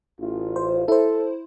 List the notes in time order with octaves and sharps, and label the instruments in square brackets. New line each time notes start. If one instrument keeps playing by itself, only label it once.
[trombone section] A1 F4
[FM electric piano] C5
[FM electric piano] E4 C5 [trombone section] A4